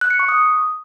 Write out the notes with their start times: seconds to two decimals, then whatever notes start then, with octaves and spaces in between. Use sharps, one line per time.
0.01 F#6
0.10 C#7
0.19 C#6
0.29 D#6